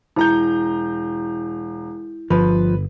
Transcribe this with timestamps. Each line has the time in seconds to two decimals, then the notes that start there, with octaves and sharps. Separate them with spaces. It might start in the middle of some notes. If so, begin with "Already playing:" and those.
0.16 E1 E4 A#5 G6
2.30 G1 F3 B4